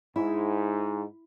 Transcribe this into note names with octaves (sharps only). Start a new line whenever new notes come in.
G#2 E4